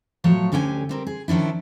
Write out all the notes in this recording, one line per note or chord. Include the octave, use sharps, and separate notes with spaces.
A2 F3 F#3 A3 C#5
D2 D3 C#4 G4 F#5 G#5
G3 C4 A#4
G#4
D#3 F3 C#4 D4 E4